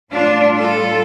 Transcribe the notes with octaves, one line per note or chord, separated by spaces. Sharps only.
A2 G3 D4 F4
F4 A4